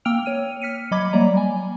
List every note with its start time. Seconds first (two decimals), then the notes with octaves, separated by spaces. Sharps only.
0.05 A#3 G5 E6 F6 D7 F7
0.26 C#5 D#7
0.62 F6 B6 C#7 D#7
0.91 F#3 D#5 B5 D6 G#6
1.13 F#3 G3 A#3 D5 A#5
1.37 G#5